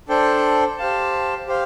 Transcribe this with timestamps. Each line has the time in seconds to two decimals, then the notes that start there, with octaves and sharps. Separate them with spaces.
0.09 D4 A4 C5 G5
0.78 G4 C5 F5 A5
1.47 G4 C5 F5